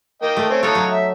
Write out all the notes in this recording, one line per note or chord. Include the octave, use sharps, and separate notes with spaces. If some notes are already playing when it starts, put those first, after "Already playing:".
A#3 D#5 G5
A3
C4 C#4
D#4 A4 C#5 F5 F#5
F#3
E5